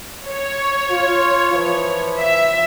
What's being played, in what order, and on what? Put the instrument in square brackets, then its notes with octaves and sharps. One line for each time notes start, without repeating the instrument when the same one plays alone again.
[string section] C#5
[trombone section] F4
E3 F3
[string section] E5